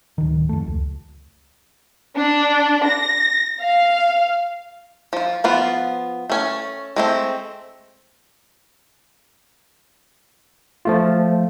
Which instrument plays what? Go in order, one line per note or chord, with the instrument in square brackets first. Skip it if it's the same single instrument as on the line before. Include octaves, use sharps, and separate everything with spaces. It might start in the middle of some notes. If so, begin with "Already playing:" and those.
[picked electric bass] D1 D#3
F2 A3
C#2
[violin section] D4
A#6
F5
[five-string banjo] F3 F4
F3 B3 F4
A3 C#4 G#5
G#3 A3 C4
[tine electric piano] F3 A3 F4